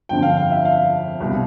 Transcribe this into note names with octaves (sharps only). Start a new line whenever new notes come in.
G1 F2 D3 F3 G5
F5
F5
E5
F5
C2 B2